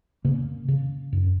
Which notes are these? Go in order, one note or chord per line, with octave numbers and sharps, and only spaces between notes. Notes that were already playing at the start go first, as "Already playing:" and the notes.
C#3 A#3
C#3
F#2